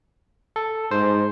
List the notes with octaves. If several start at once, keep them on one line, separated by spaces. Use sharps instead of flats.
A4
G#2 C5